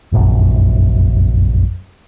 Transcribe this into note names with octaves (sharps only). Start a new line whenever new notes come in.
F1 A#1 F#2